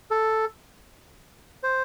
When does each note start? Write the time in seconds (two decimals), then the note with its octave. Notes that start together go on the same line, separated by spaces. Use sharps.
0.11 A4
1.63 C5